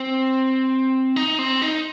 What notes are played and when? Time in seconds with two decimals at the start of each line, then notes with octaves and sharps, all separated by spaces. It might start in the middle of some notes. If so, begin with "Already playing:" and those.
Already playing: C4
1.16 D#4
1.39 C4
1.62 D#4